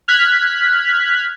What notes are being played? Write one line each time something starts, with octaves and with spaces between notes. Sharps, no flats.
F6 F#6 G#6 B6